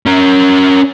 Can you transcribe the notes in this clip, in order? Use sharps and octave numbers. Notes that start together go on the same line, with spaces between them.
C#4 A#4